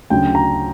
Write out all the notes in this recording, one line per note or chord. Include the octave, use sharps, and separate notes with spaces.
D2 C#3 F#3 G5
A#5